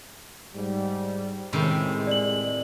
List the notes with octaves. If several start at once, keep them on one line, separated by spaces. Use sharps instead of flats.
G#2 G3
A2 C3 D#3 G#3
D5 F#7